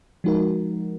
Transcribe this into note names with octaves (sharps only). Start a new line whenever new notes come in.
F3 G#3 D#4 F#4 A#4